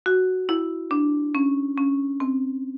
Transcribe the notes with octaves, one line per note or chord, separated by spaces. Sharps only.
F#4
E4
D4
C#4
C#4
C4